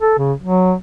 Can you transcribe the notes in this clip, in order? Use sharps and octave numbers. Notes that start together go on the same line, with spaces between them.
A4
C#3
F#3